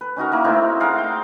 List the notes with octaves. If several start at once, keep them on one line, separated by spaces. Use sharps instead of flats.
B4
C#4 D#4 F#4 A#4
A#3 E4 A#4
A3 C4 D#4 E4
G#3 A#4 F5 F#5
G5